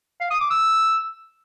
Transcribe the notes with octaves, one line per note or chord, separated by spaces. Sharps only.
F5
D#6
D6
E6